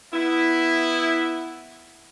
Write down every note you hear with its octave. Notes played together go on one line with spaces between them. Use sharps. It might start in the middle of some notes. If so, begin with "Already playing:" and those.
B3 E4